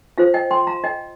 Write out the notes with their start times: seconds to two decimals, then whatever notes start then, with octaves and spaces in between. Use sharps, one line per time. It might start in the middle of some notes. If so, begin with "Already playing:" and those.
0.18 F4 C5 F5
0.34 D#5 G5
0.51 G5 C6
0.67 F5 A#5
0.84 D#5 G5